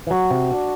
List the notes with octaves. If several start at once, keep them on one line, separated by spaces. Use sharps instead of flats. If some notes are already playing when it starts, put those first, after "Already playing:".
E3
F#3 F#4
C3
D4